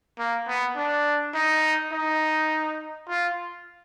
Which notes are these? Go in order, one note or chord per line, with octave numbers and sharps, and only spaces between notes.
A#3
B3
D4
D#4
D#4
F4